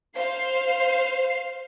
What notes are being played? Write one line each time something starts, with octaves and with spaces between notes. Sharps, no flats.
C5 F5 C7